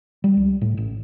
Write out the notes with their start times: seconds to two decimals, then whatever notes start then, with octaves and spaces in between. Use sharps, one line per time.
0.24 G3
0.37 C#2
0.62 A2
0.77 A1